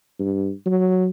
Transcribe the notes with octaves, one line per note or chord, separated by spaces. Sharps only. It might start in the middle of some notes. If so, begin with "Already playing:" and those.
G2
F#3